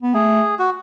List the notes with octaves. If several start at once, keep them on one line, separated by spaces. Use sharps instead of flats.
B3
A3 G#4
F#4